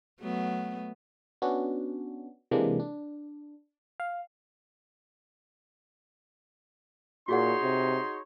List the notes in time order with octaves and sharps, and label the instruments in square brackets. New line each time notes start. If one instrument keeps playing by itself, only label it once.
[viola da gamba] F#3 A3 B3
[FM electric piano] B3 C#4 D4 F#4
C3 E3 G#3 A#3 D4
D4
F5
[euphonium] A#2 [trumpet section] D#4 C#5 C6 [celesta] F#4 G#4 F#5
[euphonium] C3